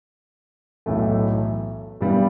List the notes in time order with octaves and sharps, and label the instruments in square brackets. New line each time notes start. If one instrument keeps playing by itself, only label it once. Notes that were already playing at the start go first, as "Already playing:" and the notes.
[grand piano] B1 A2 E3 A3
G2 E3 G3 B3